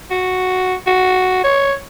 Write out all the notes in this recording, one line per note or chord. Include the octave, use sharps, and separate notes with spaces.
F#4
F#4
C#5